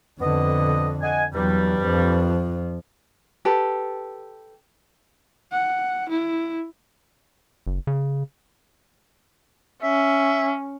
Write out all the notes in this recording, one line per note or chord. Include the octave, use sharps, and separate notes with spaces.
F2 D3 B3 D#5
D#5 F#5 G#5
E2 G2 F#3 G3
F2 F3
G4 A4 B4 A5
F#5
E4
F#1
C#3
C#4 E5